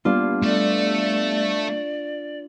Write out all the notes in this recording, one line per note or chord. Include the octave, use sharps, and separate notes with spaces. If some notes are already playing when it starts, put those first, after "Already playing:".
G3 A#3 B3 D4 F4
A3 D5